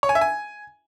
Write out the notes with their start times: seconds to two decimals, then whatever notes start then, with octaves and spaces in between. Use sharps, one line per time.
0.03 C#5
0.09 G#5
0.15 E5
0.21 G#5